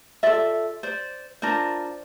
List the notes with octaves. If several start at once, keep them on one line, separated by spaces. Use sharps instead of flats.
F4 A4 D5 E5
C5 D5
D4 F4 A#4 C5 D5